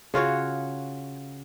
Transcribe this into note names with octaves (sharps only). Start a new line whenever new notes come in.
C#3 F4 F#4 C#5